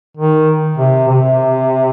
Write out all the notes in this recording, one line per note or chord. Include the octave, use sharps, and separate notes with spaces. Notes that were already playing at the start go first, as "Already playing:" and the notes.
D#3
C3
C3